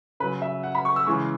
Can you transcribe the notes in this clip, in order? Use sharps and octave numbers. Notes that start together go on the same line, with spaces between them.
C#3 F#3 B4
E5
F#5
B5
C#6
E6
C#3 E3 G#3 C#6